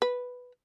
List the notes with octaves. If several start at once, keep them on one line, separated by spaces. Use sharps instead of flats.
B4